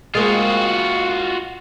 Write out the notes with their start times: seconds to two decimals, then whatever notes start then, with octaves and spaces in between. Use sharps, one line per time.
0.15 G#3 A#3 C4 F4 F#4